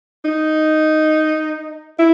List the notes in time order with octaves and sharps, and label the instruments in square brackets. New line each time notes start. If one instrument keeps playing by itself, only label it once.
[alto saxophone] D#4
E4